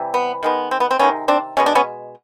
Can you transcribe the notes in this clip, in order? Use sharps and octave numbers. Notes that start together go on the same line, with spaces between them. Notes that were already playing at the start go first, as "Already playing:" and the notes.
Already playing: C3 E3 G3
B3
D#3 G#3 B3
C4
B3
C4
C3 D#3 G#3 B3 C#4
C4 D4
B2 G#3 B3 C#4
D4
B3 C#4